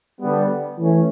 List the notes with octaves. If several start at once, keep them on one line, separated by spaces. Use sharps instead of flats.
D3 G3 B3
E3 A3 C#4